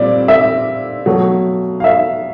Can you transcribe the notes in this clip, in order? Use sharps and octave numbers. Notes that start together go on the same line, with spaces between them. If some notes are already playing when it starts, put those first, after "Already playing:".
Already playing: A#2 G3 C4 D5
E5
B2 F#3 A3
F5
E5